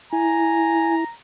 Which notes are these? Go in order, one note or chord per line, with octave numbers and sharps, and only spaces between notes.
E4 G#5 A#5